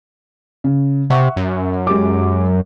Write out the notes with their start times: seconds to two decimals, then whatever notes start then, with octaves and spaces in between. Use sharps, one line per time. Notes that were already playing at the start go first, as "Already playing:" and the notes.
0.64 C#3
1.10 C3 E5 F#5 C#6
1.36 F#2
1.87 G#3 G4 D6